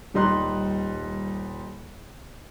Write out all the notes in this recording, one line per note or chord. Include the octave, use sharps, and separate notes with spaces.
D#1 G3 D#4 C6 F#6